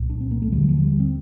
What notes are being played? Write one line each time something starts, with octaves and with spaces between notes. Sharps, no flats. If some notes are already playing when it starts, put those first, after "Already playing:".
Already playing: C2 A#2
D4
C4
A#3
A3
D#2 D3 G3
G3
F3
G3
C4